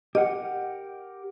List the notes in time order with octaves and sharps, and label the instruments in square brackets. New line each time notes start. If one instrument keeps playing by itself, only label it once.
[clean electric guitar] G4 A#4 F#5 [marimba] D#5